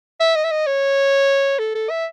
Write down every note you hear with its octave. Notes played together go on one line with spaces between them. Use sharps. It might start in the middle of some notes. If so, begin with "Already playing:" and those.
E5
D#5
E5
D#5
C#5
A4
A4
E5